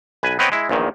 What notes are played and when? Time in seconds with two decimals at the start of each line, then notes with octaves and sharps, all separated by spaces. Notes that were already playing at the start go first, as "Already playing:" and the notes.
0.23 B1 B4 G#5
0.39 B3 C4 B4 C#5 D#5 G5
0.52 G#3 E4
0.69 A#1 E2 A#2 D#3